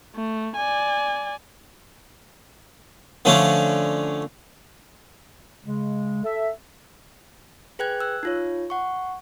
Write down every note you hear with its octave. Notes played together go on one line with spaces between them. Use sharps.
A3
D5 G#5
D3 F3 A3 C#4 D4
C#3 G#3
A4 E5
G#4 B4 G5 F#6 G#6
E6 F#6
D#4 F4 C#5
F#5 C#6